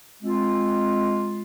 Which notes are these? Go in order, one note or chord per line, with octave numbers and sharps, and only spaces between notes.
G#3 C4 F4